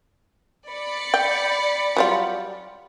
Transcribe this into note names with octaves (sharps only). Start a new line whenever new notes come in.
D5 B5 C#7
G5
F#3 G3 F4